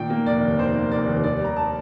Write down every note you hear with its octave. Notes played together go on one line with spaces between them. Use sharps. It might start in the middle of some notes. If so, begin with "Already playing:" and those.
Already playing: A#2 D#3 G5
A#3
F1 D5
D#2
D#3 C5
A#3
F1 D5
D#2
D#3 D5
G3 A#5
A5